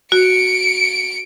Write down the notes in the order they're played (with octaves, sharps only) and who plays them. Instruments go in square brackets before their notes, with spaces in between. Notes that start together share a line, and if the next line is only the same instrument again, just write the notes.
[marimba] F#4 [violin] C#7 D7